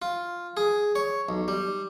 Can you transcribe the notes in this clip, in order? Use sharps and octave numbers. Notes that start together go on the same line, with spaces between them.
F4
G#4
C#5
B1
G3